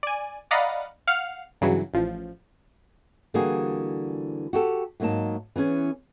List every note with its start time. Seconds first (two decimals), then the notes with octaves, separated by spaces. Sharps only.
0.03 D5 G#5
0.51 D5 D#5 F5 F#5 A#5 B5
1.07 F5 F#5 F6
1.61 G2 C#3 E3 F#3
1.94 A1 F3
3.34 D3 E3 G3 A#3 F#4 G#4
4.53 F#4 G4 A4
5.00 G#2 F#3 A#3 D#4 A5
5.56 E3 B3 C#4 G#4